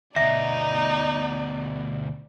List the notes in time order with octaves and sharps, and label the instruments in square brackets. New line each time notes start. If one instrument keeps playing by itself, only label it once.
[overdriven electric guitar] D2 B2 [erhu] D#4 [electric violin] D5 [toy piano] E5